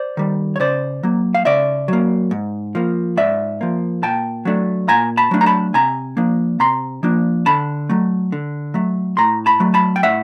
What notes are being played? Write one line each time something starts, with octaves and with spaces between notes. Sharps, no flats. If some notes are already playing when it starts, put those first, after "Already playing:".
Already playing: C5 D5
D#3 G3
C#5
C#3 C5 D5
F#3 A#3
F5
C#3 D5 E5
F#3 A#3
G#2
F3 A#3
G#2 D5 E5
F3 A#3
A#2 G5 A5
F#3 A3 D4
A#2 G#5 A#5
A5 B5
F#3 A3 D4
A#5
A5 B5
C3 G#5 A#5
F3 A#3 D4
C3 A#5 C6
F3 A#3 D4
D3 A5 B5
F#3 A3
D3
F#3 A3
A2 A#5 C6
A5 B5
F#3 A3
A5 B5
G5
A2 E5 F#5